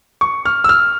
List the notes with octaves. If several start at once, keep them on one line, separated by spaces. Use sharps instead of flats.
C#6
F6
E6
F6